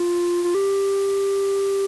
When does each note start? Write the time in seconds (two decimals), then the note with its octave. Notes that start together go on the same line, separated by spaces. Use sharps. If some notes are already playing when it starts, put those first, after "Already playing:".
Already playing: F4
0.44 F4
0.55 G4